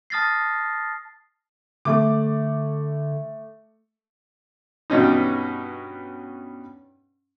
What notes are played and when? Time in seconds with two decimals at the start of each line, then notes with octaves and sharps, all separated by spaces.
0.10 A5 D#6 F6 A6 A#6 C7
1.85 D3 A3 D6
4.90 G2 B2 C#4 D#4